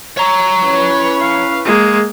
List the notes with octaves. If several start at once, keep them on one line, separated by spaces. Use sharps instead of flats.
C#5 A#5 C#6
C#4 E4 B4
F5
G#3 A#3